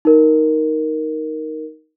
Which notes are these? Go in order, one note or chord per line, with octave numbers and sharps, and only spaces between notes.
D#4 A#4